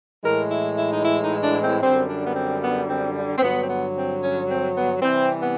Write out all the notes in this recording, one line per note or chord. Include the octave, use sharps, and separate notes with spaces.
A2 E3 G#3 A#4
E4
E4
D#4
E4
D#4
D4
C4
F#2 D3 G3 C4
D4
B3
C4
B3
C4
C4
G2 D3 F#3 B3
C4
B3
C4
C#4
C4
B3
C3 E3 G3 C4
B3